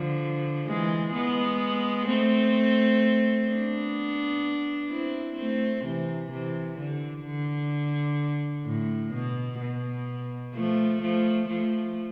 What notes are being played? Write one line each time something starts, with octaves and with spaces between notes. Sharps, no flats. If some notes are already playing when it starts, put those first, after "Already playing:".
Already playing: D3 F3
E3 G#3
G#3 B3
A3 C4
B3 D4
C4 E4
A3 C4
C3 E3
C3 E3
D3
D3
A2
B2
B2
F3 A3
F3 A3
F3 A3